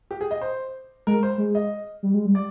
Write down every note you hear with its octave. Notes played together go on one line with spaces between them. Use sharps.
G4
G#4
D#5
C5
G#3 A#4
C5
G#3
D#5
G3
G#3
G3
D5